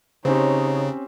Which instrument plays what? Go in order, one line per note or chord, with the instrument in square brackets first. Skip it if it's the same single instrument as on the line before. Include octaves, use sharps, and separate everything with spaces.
[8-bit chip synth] C#3 [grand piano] C4 C#4 G4 [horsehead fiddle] D#4 C#5